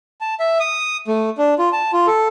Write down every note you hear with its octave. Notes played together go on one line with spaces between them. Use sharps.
A5
E5
D#6
A3
D4
F4
A5
F4
A4